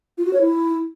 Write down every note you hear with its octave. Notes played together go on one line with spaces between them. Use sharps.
F4
F#4
C#5
E4